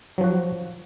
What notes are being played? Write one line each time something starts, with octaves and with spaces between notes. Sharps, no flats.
F3 F#3 F#4